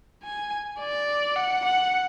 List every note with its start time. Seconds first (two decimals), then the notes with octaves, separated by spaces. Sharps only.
0.24 G#5
0.80 D5
1.36 F#5
1.66 F#5